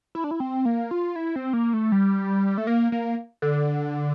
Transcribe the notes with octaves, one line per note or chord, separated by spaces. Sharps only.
E4
D4
E4
C4
A#3
F4
E4
C4
A#3
A3
G3
A3
A#3
A#3
D3